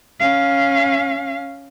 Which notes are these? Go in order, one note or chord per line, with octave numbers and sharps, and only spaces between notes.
C#4 F5